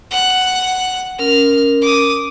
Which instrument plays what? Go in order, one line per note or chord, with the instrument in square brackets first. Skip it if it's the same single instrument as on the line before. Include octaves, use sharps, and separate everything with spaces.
[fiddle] F#5 F#6
[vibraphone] C#4 A#4 [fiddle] F6
[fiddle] D6 D#6